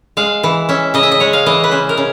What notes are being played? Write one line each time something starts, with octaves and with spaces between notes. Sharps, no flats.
G#3 F5
E3
C#4 E5
C#3 D#5
E5
D#5
G#3 C#5
F5
E3 D#5
B4
C#4 C5
A#4
C#3